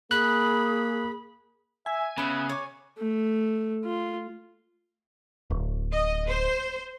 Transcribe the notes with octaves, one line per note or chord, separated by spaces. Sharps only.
A#3 G#4 B5 F#6
E5 G#5
C#3 B3 E5 B5
C#5 C#6 D6
A3
F4
D1
D#5
C5